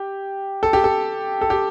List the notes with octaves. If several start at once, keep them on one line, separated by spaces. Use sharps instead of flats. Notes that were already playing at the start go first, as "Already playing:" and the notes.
Already playing: G4
A4
G4
A4
A4
G4